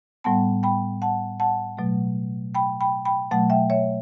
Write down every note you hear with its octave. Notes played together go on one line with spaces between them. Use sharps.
A2 G3 B3 F#5 A5
G5 B5
F#5 A5
F#5 A5
B2 F#3 A3
G5 B5
G5 B5
G5 B5
B2 F#3 A3 F#5 A5
E5 G5
C#5 E5